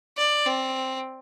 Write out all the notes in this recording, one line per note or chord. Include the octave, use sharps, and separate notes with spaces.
D5
C4